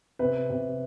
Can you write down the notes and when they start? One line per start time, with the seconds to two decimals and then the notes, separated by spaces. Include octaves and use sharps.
0.19 C3 B4
0.50 C3